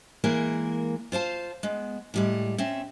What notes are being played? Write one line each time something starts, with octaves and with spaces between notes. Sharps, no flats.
E3 G#3 A#3 A#4
F4 C5 F5 A5
G#3 B3
A2 G3 G#3
C4 C#4 E5